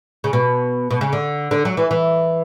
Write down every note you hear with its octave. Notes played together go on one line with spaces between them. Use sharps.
C#3
B2
B2
C#3
D3
D3
F#3
E3
E3